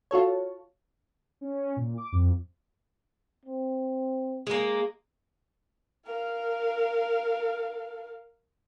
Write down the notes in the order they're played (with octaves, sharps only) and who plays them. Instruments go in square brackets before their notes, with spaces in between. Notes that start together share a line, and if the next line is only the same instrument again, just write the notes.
[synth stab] F4 F#4 A4 C#5
[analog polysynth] C#4
A#2
D6
F2
[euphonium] C4
[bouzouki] G#3 A#3
[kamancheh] A#4 F5